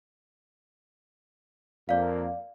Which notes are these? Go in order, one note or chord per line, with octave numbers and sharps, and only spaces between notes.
F2 A#3 D5 F5